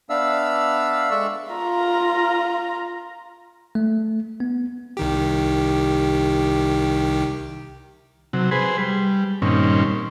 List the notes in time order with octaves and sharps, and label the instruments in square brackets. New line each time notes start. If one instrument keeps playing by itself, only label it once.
[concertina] B3 D4 D5 E5 F5 E6
G#3 A4 D5 E5 C#6 E6
[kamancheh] F4 A#5
[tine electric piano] A3
B3
[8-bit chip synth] C2 D#3 G4
[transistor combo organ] C3 F#3
G#4 B4 C5
G3
G2 A#2 D#3 C4 C#4